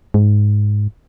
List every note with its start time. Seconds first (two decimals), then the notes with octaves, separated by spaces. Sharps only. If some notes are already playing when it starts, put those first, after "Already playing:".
0.14 G#2